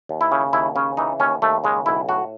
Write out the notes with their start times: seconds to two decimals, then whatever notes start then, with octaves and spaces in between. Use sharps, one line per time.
0.09 D#2
0.21 E4
0.32 C#3
0.53 D#2 E4
0.76 C#3 C#4
0.97 E3 D#4
1.20 D#2 C#4
1.42 D#2 A3
1.64 C#3 G#3
1.86 B1 E4
2.08 A2 F#4